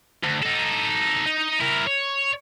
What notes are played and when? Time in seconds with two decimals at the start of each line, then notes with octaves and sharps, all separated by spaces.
0.23 D2
0.42 D#4 A4
1.26 D#4
1.60 E4 A#4
1.87 C#5